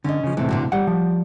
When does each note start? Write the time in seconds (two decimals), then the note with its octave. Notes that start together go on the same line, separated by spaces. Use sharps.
0.04 D3 C#4 D#5
0.23 C#3 F3
0.37 A2 C3 E3 A3 C4
0.49 A#2 D3 F#4
0.72 G3 F#5
0.87 F3